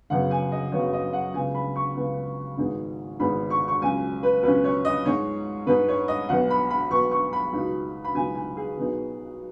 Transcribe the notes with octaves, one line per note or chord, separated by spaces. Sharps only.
F#1 F#2 C#3 B3 F#5
G#5
D#5
F#1 F#2 C#3 B3 C#5
D#5
F#5
C#2 C#3 B3 G#5
B5
C#6
C#2 C#3 B3
G#1 G#2 G#3 B3 D#4
G#1 G#2 G#3 B3 D#4 B5
C#6
C#6
C#2 B2 F#3 C#4 G#5
B4
C#2 B2 F#3 C#4 B4
C#5
D#5
G#2 G#3 D#4 C#5
G#2 G#3 D#4 B4
C#5
D#5
B1 B2 B3 F#5
B5
B5
B1 B2 B3 C#6
C#6
B5
C#2 B2 F#3 D#4
B5
C#2 B2 F#3 D#4 G#5
G#5
G#4
B1 B2 B3 D#4